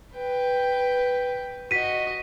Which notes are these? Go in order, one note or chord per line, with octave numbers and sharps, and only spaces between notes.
B4 G5
F#4 D#5 B6 D#7